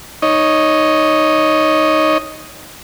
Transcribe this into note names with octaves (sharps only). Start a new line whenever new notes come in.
D#4 C#5 D#5